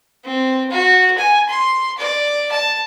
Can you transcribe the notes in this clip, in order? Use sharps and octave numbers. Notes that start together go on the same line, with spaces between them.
C4
F#4
G#5
C6
D5
A5